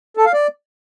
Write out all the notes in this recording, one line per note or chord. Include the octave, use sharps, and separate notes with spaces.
A4
F5
D5